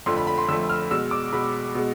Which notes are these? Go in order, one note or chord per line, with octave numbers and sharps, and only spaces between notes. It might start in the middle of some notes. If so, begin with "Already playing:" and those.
F2 D3 F3 A3 C6
B5
B5
C6
F2 D3 F3 A3 E6
F6
B2 G#3 E6
D6
B2 G#3 B5
B2 G#3